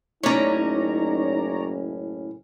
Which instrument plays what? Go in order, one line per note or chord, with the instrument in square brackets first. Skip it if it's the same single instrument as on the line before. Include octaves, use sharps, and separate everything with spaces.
[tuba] F#1 [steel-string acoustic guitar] A2 C#4 [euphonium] D#4 [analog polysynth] C#5 D5 A#5